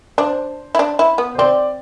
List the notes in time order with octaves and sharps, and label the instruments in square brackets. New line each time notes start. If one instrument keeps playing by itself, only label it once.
[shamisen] D4 [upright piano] C5
[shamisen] E4
D4
E4
B3
[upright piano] C5
[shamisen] C4 [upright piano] D5